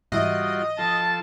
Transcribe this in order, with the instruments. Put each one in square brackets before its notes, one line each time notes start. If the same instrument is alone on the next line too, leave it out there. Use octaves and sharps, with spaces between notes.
[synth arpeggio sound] G#2 E3 E5 [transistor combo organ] G3 F4 F#4 [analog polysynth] D#5
[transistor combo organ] F3 A4 [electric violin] A5